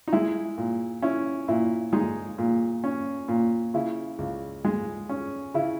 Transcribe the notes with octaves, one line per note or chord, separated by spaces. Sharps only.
D#4
G#3 E4
A#2
C#4 E4
A#2 E4
G#3 D#4
A#2
C#4
A#2
C#3 E4
C#2
G#3
C#4
C#3 E4